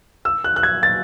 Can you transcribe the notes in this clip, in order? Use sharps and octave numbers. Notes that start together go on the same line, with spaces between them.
E6
F#6
F#6
G#6
A6